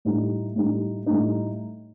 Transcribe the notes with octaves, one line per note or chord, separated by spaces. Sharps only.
A2 G3 D#4
A2 G3 D#4
A2 G3 D#4